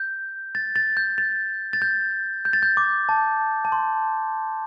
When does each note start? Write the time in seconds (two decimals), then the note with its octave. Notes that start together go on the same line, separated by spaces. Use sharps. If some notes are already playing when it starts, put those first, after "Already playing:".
Already playing: G6
0.55 A6
0.76 A6
0.97 G6
1.18 A6
1.73 A6
1.82 G6
2.45 G6
2.53 A6
2.63 G6
2.77 D6
3.09 A5
3.65 A5
3.72 C6